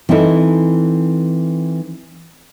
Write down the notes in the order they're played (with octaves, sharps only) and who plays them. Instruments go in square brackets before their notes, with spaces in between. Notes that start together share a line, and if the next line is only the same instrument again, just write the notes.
[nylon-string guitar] E3 C4 D#4 E4 A4